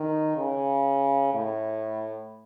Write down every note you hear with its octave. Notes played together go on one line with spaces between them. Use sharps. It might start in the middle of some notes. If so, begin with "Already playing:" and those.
Already playing: D#3
C#3
A2